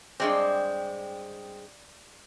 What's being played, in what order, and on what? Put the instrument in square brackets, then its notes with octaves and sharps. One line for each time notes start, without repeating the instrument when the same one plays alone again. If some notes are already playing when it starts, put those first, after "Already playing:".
[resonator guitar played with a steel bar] G2 G#3 C4 [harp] D5